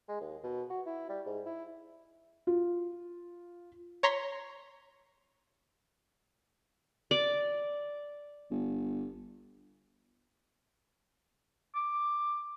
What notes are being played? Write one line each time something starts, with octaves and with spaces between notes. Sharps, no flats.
G#3
D#2
B2
F#4
E4
G3
G#2
E4
F4
C#5 A#5 C6 B6
D5
G1
D6